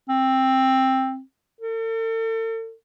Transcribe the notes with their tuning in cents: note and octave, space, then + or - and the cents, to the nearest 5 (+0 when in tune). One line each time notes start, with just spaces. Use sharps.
C4 +10
A4 +40